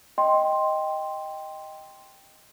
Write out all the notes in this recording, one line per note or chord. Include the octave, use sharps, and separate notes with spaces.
D#5 G5 C6